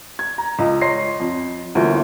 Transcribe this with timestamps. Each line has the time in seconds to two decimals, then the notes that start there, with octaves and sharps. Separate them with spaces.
0.19 G#6
0.38 A#5
0.59 C#2 D#5
0.81 C#5 D#5 C6 A#6 C7
1.20 F2
1.75 G1 D2 A#2 E3